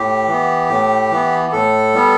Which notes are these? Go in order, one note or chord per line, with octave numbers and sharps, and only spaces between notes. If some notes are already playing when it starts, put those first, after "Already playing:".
Already playing: A2 G4
E3 B3
A2
E3 B3
A2 A4
G3 B3